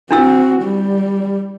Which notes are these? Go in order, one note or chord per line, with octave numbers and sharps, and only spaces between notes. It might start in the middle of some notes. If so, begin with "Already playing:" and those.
C4 D4 E4 F#4 E6
G3